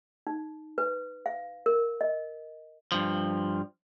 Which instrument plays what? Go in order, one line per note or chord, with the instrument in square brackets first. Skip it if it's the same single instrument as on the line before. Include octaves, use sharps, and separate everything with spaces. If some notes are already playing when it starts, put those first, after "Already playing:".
[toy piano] D#4
B4
F5
A#4
D#5
[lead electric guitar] G2 F3